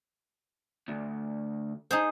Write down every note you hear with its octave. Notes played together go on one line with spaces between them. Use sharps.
D2
D#4 G#4 C5